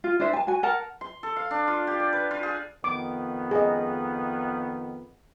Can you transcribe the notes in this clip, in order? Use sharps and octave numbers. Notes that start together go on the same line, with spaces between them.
F4
D4 E4 C5 E5
G#5 A5
F#4 G#5
A#4 F#5 A5 A#5
C6
A4
F5
D4
F4
G4
D5
B4
F4
G#4
F2 D#3 B3 D6
G#4 D#5